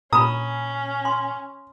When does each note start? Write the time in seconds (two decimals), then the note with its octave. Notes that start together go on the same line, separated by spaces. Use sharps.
0.13 A#2 C#4 A#5 B5 D#6
1.05 C6